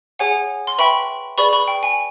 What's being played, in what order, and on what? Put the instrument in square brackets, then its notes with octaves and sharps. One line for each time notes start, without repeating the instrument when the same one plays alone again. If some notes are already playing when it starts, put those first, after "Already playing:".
[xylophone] G#4 C#5 F#5 G#5
C6
B4 E5 G5 B5 C#6
G#4 B4 D5 B5 C#6
B5 C#6
G5
G#5